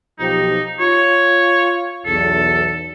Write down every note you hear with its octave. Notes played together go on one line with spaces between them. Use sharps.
B1 F3 D#4 G4
F4 C#5
B1 E2 A4